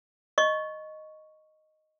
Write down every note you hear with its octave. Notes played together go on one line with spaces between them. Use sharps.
D#5 C#6